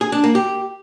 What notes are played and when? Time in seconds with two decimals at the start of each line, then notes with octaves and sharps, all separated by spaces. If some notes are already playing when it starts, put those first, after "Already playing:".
0.01 G#4
0.12 D4
0.24 A#3
0.35 G4